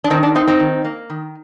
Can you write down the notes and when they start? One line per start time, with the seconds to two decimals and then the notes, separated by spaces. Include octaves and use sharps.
0.04 D4
0.10 D#3 C4 D#4
0.23 D4
0.35 A#3 C4 D#4
0.47 C4 D#4
0.60 D#3
0.84 A#3
1.10 D#3